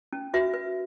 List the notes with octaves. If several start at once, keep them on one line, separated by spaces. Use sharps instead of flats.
C#4
F#4 B4 E5
B4